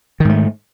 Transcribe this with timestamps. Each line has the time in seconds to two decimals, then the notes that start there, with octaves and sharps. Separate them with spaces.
0.20 D#3
0.25 G#2
0.30 A3